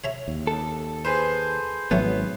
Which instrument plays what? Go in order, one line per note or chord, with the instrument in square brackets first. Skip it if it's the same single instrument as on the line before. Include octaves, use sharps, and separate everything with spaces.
[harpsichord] C#5 E5 A#5
[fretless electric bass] D#2
[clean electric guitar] A4
[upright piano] G#4 B4 C5
[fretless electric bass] G#1 [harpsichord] F#3 A3 C#5 [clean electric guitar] B3